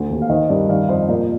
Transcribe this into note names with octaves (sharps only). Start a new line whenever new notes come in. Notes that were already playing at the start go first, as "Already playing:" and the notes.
Already playing: D2 D3
D#2
F5
D#3 C5 D#5
G2 A#4 D5
D#3 D5 F5
F2 C5 D#5
A#2 A#4 D5